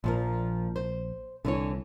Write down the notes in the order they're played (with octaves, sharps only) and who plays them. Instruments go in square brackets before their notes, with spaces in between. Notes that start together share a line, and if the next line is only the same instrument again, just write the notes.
[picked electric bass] A#1 [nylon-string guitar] A#2 F3 A#4
[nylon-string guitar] C5
[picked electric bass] C2 [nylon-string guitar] D3 E3 C#5